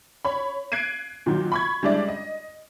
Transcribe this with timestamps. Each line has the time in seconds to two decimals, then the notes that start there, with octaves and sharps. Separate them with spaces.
0.25 C#5 B5
0.72 F#6 G#6 C7 D7 D#7
1.26 A#2 D#3 F#3
1.52 B5 C#6 G#6
1.83 G3 G#3 D4 E4 D5 E5
2.08 D#5